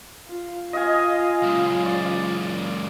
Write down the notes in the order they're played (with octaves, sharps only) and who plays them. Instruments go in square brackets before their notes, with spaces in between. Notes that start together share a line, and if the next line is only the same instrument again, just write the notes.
[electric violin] F4
[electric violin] F4 [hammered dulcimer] D#5 F5 G#5
[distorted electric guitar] C#2 F#2
[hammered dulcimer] D5